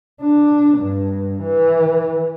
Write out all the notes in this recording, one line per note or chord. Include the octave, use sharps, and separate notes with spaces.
D4
G2
E3